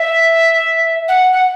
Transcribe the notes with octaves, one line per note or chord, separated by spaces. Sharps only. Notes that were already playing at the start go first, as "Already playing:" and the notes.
Already playing: E5
F#5
F#5